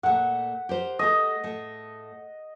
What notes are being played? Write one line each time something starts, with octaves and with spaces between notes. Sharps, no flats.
A#2 A3 F#5
G4 A#4 C5
A3 G4 D#5
A2 A3